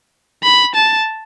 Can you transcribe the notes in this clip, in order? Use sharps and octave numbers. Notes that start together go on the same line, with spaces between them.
B5
A5